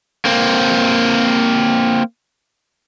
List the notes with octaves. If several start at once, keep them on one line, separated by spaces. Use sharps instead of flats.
A#3 C4